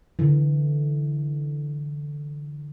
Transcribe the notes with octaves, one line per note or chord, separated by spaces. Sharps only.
D3 E3